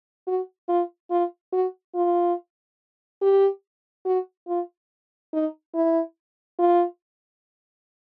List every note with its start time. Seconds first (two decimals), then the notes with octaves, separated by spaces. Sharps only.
0.27 F#4
0.68 F4
1.11 F4
1.53 F#4
1.95 F4
3.22 G4
4.06 F#4
4.48 F4
5.33 D#4
5.74 E4
6.59 F4